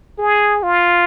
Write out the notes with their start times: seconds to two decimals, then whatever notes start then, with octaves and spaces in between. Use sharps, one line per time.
0.19 G#4
0.63 F4